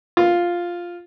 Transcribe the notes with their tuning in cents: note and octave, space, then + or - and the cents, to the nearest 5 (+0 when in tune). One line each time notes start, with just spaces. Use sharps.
F4 +0